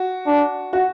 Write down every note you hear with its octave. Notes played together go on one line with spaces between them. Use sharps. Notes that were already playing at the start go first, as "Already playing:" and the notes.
Already playing: F#4
D4
F#4